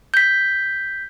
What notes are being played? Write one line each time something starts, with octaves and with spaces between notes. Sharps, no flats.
G6 B6